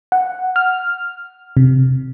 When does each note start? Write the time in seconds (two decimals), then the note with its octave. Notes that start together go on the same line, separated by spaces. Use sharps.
0.12 F#5
0.56 F6
1.57 C3